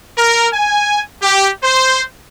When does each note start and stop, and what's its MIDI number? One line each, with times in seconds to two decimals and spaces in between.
0.17 0.48 70
0.54 1.01 80
1.22 1.49 67
1.64 2.02 72